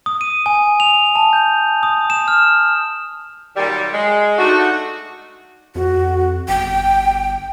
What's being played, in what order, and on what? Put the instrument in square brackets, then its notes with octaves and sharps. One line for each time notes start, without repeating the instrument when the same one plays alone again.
[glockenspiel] D#6
D#7
G#5
F7
A5
G6
D#6
E7
F6
[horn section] A#2 D#3 F#3 G3
G#3
A3 D4 D#4 F#4
[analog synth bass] F2 [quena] F#4
[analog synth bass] G1 [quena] G5